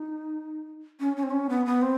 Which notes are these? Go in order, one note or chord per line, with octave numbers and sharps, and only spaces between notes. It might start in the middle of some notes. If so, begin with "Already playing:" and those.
Already playing: D#4
C#4
C#4
C4
C#4
B3
B3
C4